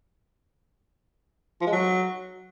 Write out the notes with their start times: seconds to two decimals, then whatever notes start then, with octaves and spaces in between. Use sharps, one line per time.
1.61 F3
1.67 G#3
1.72 F#3